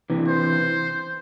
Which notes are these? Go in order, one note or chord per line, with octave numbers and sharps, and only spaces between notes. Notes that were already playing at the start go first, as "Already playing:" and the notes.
C3 E3
C5